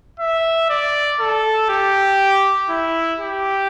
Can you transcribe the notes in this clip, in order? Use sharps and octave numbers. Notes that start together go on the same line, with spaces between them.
E5
D5
A4
G4
E4
G4